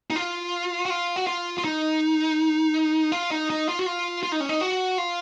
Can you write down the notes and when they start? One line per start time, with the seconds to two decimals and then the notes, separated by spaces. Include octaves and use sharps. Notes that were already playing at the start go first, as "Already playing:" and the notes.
0.10 D#4
0.16 F4
0.85 F#4
0.90 F4
1.16 F#4
1.27 F4
1.58 F4
1.64 D#4
3.12 F4
3.31 D#4
3.50 D#4
3.69 F4
3.79 F#4
3.86 F4
4.23 F4
4.32 D#4
4.40 C#4
4.49 D#4
4.61 F#4
4.98 F4